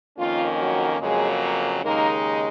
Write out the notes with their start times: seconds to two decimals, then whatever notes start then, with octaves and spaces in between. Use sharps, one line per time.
0.18 F2 D#3 A#3 C#4 F4
0.59 F#3 F#4
1.00 F2 C#3 F#3 G#3 A#3 G#4
1.82 D#2 C#3 G#3 A#3 D#4 A#4